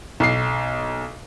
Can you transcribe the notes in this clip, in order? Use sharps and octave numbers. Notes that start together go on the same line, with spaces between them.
B1 C7